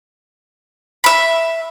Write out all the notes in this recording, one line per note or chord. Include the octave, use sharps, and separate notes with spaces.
E5 B5